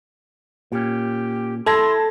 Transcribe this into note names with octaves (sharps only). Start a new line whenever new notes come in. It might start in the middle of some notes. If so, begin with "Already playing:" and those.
A#2 C#4 G4
E4 A4 A5 C6 G#6 A#6